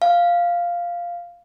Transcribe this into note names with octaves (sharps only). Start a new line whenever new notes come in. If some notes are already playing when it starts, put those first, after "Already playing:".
F5